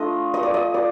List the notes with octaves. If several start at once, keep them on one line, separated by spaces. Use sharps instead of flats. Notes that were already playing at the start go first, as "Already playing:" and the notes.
Already playing: A3 D4 F4 D#5
D#5
D5
D#5
D5